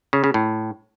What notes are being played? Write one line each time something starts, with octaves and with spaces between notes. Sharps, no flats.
C#3
C#3
A2